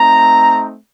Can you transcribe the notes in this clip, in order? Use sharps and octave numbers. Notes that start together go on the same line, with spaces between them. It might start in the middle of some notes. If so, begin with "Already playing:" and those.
Already playing: A3 C4 D#4 A#5